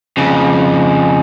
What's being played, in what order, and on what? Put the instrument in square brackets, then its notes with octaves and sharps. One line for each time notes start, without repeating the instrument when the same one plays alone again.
[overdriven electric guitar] F2 C#3